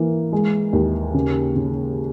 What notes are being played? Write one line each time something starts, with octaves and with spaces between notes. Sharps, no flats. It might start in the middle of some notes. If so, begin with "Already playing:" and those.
Already playing: E3 A#3
G#3
D#2
C#3
C#3